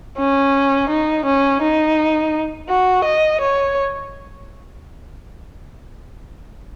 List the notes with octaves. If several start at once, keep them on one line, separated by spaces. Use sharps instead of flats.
C#4
D#4
C#4
D#4
F#4
D#5
C#5